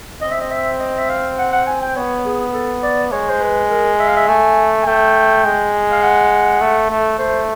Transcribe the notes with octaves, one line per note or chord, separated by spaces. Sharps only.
C4 D#5
E5
D#5
E5
D#5
E5
F5
F#5
F#5
G#5
G5
B3 C#5
G#4
A4
D5
G#3 C#5
C5
B4
A#4
E5
F5
E5
A3 G#5
G#5
A3 G5
G#3
F5
F#5
A3
A3
A3 C5